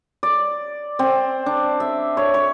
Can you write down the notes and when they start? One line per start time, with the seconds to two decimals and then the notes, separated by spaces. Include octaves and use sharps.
0.23 D5
0.99 C4
1.46 D4
1.80 E5
2.17 C#5
2.34 C#5